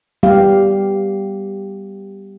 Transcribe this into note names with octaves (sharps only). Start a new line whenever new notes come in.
G3 B3 G4 F5